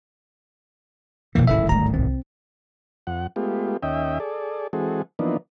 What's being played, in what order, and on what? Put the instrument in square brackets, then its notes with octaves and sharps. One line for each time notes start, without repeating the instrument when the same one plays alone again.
[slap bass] G1 E3 [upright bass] F2 B2 [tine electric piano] A#3
[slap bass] D1 G#1 D#3 [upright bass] C#2 [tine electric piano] E4 A4 E5
[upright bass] G3 A3 [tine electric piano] A#5
[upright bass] C2 [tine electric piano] C4
[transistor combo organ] F2 F#5
G#3 A3 B3 F4 G4
D#2 C#4 D#5 E5 G5
G#4 A4 D5
E3 G#3 C4 F#4 G#4 A4
E3 F3 A#3 B3 D4 D#4